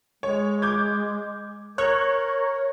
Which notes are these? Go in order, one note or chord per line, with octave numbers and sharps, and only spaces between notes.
G#3 C#5
D6 G6 G#6
A#4 C#5 F#6